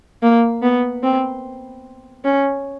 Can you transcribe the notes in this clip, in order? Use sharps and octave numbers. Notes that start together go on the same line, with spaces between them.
A#3
B3
C4
C#4